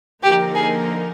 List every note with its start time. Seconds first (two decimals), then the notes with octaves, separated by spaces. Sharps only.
0.23 D3 F3 A#3 D#4 G4 A#4
0.55 G#4